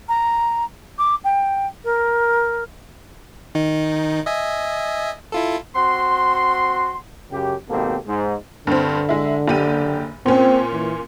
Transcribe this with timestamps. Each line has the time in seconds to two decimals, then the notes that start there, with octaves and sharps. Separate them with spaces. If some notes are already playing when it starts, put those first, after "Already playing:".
0.09 A#5
0.99 D6
1.24 G5
1.84 A#4
3.55 D#3 D#4
4.26 D#5 E5 G#5
5.32 E4 F4 A4
5.76 C4 F#4 F#5 C6
7.30 F#2 C#3 G4
7.69 G#1 B2 A#3 C4 G4 A4
8.07 G#2
8.67 G2 D3 C4
9.09 G#3 E4
9.48 F#1 G4 D#7
10.26 A#2 C4 C#4
10.73 E3